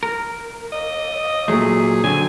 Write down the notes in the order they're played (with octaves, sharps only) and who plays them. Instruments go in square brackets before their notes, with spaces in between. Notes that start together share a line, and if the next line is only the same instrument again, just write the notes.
[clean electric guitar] A#4
[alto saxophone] D#5
[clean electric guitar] A#2 F#3 A3 [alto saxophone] G#4
[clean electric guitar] D3 F#3 C4 [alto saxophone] G#5